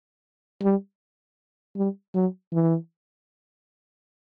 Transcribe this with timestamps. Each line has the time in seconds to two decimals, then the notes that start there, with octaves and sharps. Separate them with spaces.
0.62 G3
1.76 G3
2.15 F#3
2.53 E3